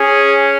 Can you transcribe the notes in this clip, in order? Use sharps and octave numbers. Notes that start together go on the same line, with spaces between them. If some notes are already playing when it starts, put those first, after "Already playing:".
Already playing: C#4 G#4